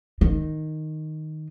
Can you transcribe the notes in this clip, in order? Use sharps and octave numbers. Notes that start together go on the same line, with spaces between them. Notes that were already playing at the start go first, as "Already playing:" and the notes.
D#3